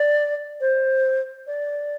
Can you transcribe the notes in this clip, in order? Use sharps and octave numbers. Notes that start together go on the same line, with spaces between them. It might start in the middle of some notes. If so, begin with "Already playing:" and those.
Already playing: D5
C5
D5